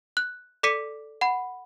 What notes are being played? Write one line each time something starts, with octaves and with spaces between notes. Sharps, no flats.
F#6
A4 D5 D6 B6 C#7 D#7
F#5 B5